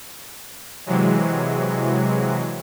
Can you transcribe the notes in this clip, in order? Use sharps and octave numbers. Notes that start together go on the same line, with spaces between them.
C3 E3 F#3 G#3